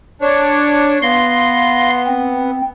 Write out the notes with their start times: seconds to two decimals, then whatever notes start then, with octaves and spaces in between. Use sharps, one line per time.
0.22 D4 C#5
1.02 B3 F5 C6 A#6
2.07 C4